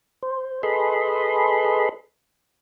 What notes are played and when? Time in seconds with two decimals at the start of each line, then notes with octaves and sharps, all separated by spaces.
0.23 C5
0.63 G#4 A4 B4 D#5 B5 C6